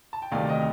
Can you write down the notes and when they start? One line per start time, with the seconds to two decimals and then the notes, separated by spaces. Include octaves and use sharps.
0.13 A5
0.22 G5
0.31 D2 C3 D#3 A3 D5 F5
0.49 D#5 G5